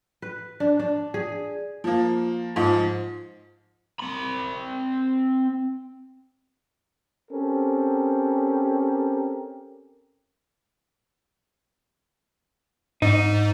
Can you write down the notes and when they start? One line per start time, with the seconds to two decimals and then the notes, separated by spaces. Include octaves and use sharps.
0.22 B4
0.60 D4
0.79 D4
1.14 G#4
1.84 F3 A#3
2.56 G#2 F3
3.99 C4 B5
7.31 C4 C#4 G4 A4 A#4
13.02 G#2 D#4